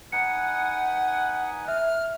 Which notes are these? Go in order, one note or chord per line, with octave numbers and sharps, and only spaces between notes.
D#4 B4 F#5 G#5 C#7
E5 F6